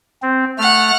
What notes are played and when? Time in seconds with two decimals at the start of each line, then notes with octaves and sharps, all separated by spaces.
0.22 C4
0.58 A3 F#5 F6